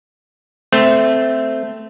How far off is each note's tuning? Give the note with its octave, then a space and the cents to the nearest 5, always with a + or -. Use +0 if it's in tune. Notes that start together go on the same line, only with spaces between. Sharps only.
A3 +0 C4 -15